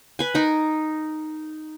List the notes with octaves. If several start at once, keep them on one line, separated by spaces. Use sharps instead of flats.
B4 G#5
D#4 A#4